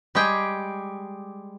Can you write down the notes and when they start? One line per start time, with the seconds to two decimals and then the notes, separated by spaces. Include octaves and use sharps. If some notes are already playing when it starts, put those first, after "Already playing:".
0.15 G3 G#3 G4 G#4 G5